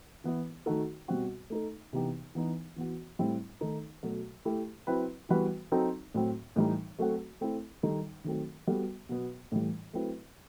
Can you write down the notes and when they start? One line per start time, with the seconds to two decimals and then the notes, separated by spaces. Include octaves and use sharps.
0.24 E3 B3 E4
0.66 D#3 A3 D#4 F#4 A4
1.08 B2 G3 C4 F#4
1.50 A3 D#4 A4
1.93 C3 E3 B3 D#4 G4
2.35 E3 B3 D#4
2.76 E3 B3 F#4
3.19 A2 G3 C4 E4
3.61 D#3 A3 D#4 A4
4.03 B2 F#3 A3
4.45 A3 E4 G4
4.87 F#3 C4 E4 B4
5.29 E3 G3 B3 F#4 B4
5.72 F#3 C4 D#4 A4
6.14 A2 F#3 C4
6.56 A2 E3 G3 D#4
6.99 F#3 A3 C4 F#4 A4
7.41 A3 C4 E4
7.83 D#3 G3 D#4 A4
8.24 D#3 F#3 A3 C4
8.67 G3 B3 F#4 A4
9.09 B2 F#3 B3
9.52 A2 E3 G3
9.93 F#3 A3 C4 E4 B4